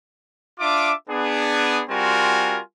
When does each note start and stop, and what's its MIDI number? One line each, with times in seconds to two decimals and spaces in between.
0.60 0.94 62
0.60 0.94 65
0.60 0.94 76
0.60 0.94 86
1.10 1.83 59
1.10 1.83 62
1.10 1.83 68
1.90 2.60 55
1.90 2.60 60
1.90 2.60 65
1.90 2.60 66
1.90 2.60 70
1.90 2.60 80